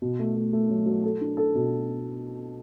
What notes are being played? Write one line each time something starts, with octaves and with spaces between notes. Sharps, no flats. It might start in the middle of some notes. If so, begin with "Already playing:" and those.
B2
A3
A3
A3
F#3
F#3
A4
D4
A4
B2